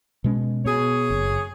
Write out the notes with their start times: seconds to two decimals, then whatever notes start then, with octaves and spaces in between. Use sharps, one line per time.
0.24 B2 G#3 C#4
0.66 B2 G#4 C#5
1.10 F#1